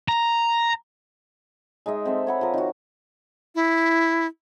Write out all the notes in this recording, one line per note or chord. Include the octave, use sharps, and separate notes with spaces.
A#5
G#3 D#4 D#5 E5
C4 A4 E5
C#5 F#5 B5
F3 A#4
D#3 F#4
E4